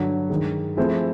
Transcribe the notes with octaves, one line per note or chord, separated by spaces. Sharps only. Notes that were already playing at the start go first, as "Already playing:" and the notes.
Already playing: G2 D3 F#3
G2 D#3 G#3
F3 A3 C4 E4 G#4